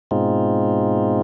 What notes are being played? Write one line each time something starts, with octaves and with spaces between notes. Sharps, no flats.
G#2 B2 G#3 C4 D#4 F4